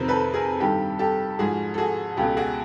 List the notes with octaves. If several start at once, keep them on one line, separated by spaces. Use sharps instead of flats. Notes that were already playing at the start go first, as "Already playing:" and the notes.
Already playing: F2 C3 D#3 A#4 C5
A4 B4
G#4 A#4
G2 D#3 G4 A4
G4 A4
G#2 F3 F#4 G#4
A4
F#4 G#4
C#2 B2 G4 A4
F#4 G#4